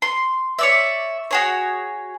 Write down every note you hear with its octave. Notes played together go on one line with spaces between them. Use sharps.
C6
C#5 D5 E5
F#4 G#4 C#5